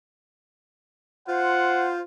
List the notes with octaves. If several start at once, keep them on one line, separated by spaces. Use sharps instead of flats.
F4 C5 F#5